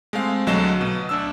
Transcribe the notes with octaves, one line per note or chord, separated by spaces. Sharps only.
G#3 A3 C4 F5
B1 D3 F#3 A3 D#5 E7
B2
D2 D4 E6